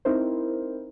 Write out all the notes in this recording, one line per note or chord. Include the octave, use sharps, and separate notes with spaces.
C4 D#4 E4 A#4 C5